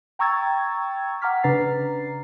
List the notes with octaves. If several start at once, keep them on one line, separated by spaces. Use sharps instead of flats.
G5 A#5 C#6 E6 G#6 A6
F#5 A#5 D6 F6 B6
C#3 D4 B4 A#5 A6 C7